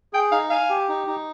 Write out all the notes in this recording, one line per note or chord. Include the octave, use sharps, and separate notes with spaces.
G#4 G5
D#4 F5
F5 G#5
G4
D#4
D#4